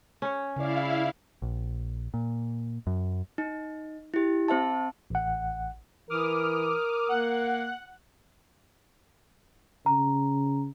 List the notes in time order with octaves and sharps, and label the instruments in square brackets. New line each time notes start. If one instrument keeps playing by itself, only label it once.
[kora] C#4 C#5
[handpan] C#3 D5 [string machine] E4 F5
[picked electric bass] A#1
A#2
F#2
[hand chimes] D#4
E4 G4
C4 C5 E5 A5
[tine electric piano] A1 F#5
[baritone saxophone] E3 [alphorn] A#4 [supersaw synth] D6 D#6 F6
[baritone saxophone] A#3 [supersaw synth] F#5 F#6
[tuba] C#3 [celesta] A#5